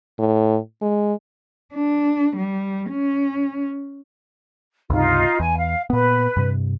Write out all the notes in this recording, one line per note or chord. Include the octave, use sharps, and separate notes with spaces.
A2
G#3
D4
G3
C#4
C#2 G2 C3 D#4 F4
E2 G#5
F5
A#2 B3 B4
G2 C3